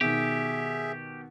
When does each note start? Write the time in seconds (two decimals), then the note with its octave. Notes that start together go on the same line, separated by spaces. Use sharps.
0.01 B2 D#3 G4 G#4 E5